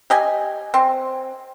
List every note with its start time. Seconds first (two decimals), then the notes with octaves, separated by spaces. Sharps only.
0.10 G4 D#5 G#5
0.74 C4